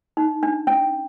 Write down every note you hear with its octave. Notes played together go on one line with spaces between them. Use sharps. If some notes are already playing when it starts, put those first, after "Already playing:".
D#4
D4
C#4